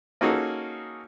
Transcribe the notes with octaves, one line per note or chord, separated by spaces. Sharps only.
A#3 C#4 D#4 F#4 G#4 A4